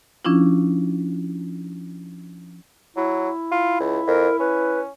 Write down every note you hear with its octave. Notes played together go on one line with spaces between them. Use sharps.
F3 C#4 D4 E4 F4
F#3 E4
F4
C#2
F2 A#4
C#4 B4